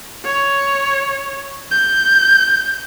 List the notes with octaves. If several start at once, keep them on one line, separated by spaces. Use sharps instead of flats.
C#5
G6